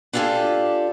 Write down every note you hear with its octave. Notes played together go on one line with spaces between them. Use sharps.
D4 E4 F4 G4 A4 G#5